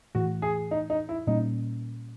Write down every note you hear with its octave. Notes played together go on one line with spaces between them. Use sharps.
A2 E3 A3 F#4
G#4
D#4
D#4
E4
A#2 G3 A#3 C#4 D#4